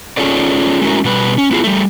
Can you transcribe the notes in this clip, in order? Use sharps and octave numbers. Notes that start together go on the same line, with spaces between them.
C#4 F4 G#4 A4 C#5 D5
G#3 A3 C#4 E4 F#4 A#4
B2 G3 B4
C#4
B3 E4 F4 G#4 B4
G3 A3